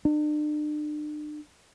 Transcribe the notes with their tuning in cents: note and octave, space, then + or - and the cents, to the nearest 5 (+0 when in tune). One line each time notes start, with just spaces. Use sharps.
D4 +40